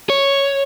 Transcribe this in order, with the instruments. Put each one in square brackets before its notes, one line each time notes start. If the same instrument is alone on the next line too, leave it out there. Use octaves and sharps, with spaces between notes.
[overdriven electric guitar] C#5